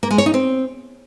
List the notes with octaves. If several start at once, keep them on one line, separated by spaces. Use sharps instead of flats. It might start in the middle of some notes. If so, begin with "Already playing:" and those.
A#3
G#3
C#5
D#4
C4